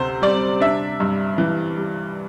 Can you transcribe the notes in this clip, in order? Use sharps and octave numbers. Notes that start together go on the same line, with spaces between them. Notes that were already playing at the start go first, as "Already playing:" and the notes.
Already playing: D2 C3 C5
G3 D5
D4 E5
G2
E3
G3